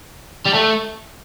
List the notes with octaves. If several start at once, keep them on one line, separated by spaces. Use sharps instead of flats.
G3
A3